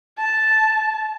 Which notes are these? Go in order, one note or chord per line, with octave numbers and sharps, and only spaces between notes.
A5